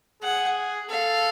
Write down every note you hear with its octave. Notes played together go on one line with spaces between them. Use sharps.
G#4 F#5
A4 F5